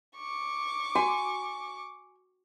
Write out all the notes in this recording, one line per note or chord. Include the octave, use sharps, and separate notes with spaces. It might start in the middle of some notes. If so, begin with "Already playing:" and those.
C#6 D6
F#4 G#5